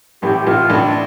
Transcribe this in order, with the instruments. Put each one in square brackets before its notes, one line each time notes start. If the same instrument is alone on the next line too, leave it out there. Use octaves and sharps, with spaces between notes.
[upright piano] A1 A2 [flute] G4
[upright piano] A1 A2 [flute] F4
[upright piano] A1 A2 [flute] D4
[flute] D4